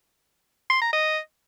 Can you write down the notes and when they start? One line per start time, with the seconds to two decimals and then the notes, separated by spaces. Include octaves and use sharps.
0.70 C6
0.82 A#5
0.93 D#5